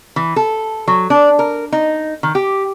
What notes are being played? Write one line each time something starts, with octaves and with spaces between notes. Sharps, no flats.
E3
A4
F#3
D4
A#4
D#4
D#3
G4